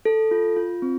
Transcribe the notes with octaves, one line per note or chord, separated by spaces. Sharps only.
A4
F4
F4
C4